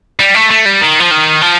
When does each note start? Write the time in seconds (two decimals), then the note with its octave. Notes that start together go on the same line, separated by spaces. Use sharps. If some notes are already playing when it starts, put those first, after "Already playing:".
0.20 G3
0.35 A3
0.51 A3
0.65 G3
0.81 D#3
1.00 F3
1.11 D#3
1.42 F3